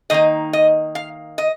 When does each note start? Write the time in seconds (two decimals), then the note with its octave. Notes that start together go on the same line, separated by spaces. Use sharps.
0.10 D#3 A#3 D#4 D#5
0.53 D#5
0.95 F5
1.38 D#5